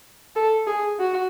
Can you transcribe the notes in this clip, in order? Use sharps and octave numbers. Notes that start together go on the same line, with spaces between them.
A4
G#4
F#4